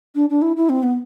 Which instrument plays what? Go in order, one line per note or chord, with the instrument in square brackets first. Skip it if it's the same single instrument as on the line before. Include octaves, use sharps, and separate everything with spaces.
[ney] D4
D4
E4
E4
C4
B3